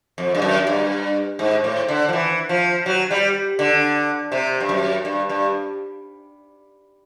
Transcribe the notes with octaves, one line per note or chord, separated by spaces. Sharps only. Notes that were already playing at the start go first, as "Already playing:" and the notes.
F2
G2
F#2
G2
G#2
A2
D3
F3
E3
F3
F#3
G3
D3
C3
G2
F#2
G2
G2